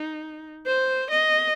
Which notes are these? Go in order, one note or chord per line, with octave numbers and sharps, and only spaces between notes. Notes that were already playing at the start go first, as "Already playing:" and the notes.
Already playing: D#4
C5
D#5